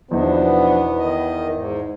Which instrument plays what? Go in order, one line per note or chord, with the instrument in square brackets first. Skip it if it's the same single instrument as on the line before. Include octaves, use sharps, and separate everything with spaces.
[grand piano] E2 D#4 [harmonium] B2 F3 D4 [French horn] B3
[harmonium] D#3 D#5
G#2